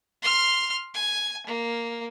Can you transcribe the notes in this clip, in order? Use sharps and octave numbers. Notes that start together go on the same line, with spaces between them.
C6 F6
G#5
A#3